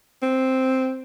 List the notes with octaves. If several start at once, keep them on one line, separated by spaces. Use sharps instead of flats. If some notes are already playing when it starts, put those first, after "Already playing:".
C4